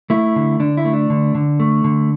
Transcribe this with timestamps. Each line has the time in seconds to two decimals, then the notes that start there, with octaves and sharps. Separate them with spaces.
0.10 A3 E4
0.36 D3
0.60 D3 D4
0.77 E4
0.85 A3
0.93 D4
1.10 D3
1.35 D3
1.60 A3
1.84 D3